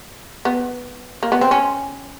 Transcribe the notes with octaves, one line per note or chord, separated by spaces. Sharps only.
B3
A#3
B3
C4
C#4